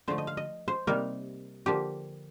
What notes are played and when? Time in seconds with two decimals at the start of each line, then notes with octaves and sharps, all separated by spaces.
0.08 D3 F3 A3 C5
0.18 D#5
0.27 F5
0.37 D#5
0.68 C5
0.87 C3 G3 A#3 D#4 A#4
1.66 D3 F3 A#3 G4